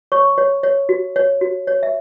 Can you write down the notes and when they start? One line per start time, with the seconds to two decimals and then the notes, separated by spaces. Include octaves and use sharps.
0.12 C#5 C#6
0.38 C#5
0.63 C#5
0.89 F#4
1.16 C#5
1.41 F#4
1.67 C#5
1.83 E5